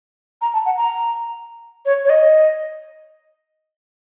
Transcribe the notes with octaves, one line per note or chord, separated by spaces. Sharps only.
A#5
A5
F#5
A#5
C#5
C#5
D#5